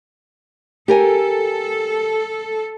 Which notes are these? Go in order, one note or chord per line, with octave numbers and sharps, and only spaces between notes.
G4 A4 A#4 G#5